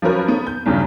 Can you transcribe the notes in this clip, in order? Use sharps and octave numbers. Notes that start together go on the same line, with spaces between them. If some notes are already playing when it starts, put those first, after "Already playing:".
F3 F#3 C#4 A#4 B4
B3
G6
B1 E2 G2 C#3